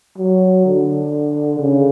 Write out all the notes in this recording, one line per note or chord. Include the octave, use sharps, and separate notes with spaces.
F#3
D3
C#3